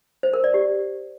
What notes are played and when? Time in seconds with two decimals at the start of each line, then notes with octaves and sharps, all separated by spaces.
0.23 C5
0.34 A#4
0.44 D5
0.54 G4